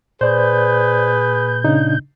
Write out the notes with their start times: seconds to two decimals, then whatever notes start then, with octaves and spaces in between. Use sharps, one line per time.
0.21 A#2 G#4 B4 C5 D5 G6
1.64 C#3 D4 D#4